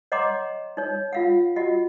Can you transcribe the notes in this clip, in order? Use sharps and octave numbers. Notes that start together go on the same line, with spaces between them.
C#5 D#5 F#5 A#5 C6 D6
D#4 C#5
F4 F5 F#5
F4 F#4 D#5 F#5